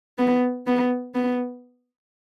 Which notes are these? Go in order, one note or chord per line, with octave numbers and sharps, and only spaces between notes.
B3
B3
B3